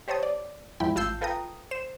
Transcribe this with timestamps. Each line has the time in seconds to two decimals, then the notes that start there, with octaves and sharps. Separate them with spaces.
0.08 G4 C5 C#5 A5 D#6
0.23 D5
0.80 E2 G#2 F3 E4 G5 B5
0.95 A1 F4 A5 E6 G6 C7
1.21 F4 A4 B4 G5 A#5 D#6
1.71 C5 E7